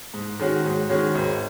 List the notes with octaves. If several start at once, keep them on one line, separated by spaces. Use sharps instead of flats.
G#2
D#3 G#3 C#4 F#4
G#2
D#3 G#3 C#4 F#4
G#1